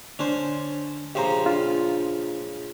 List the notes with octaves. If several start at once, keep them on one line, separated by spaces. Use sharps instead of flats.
D3 C#4 D4 C5
A#1 C#3 G4 C5 A#5
D4 F4